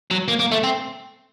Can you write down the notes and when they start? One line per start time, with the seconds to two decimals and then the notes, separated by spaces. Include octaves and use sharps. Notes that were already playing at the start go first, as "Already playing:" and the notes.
0.11 F#3
0.28 A#3
0.40 A#3
0.52 A3
0.64 C4